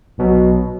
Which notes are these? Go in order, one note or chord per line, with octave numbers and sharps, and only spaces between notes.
B1 B2 F#3